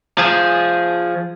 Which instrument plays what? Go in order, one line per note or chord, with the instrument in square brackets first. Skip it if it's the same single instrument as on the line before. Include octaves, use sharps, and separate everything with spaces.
[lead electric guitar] F3 G#4